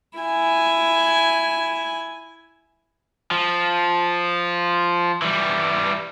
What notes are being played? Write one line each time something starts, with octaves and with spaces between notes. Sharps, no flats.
E4 G#5
F3
E3 G3